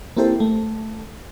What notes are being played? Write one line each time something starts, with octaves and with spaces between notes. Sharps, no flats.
A#3 C4 E4 G4 A4 C5
A3